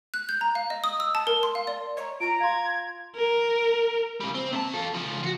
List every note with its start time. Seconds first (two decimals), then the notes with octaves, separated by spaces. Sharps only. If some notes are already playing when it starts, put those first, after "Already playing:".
0.14 F#6
0.29 G6
0.41 A#5
0.55 F5
0.70 D#5
0.84 D#6
1.00 E6
1.15 A5
1.27 A#4
1.43 C6
1.55 F5
1.67 D5
1.97 C#5 D#5 A#5
2.20 F4 A#5 D7
2.40 F5 C6 G#6
3.16 A#4
4.21 C#3 G3
4.35 C4
4.53 C3 A5
4.74 F4 A4
4.94 C#3 F3
5.23 F4 F#4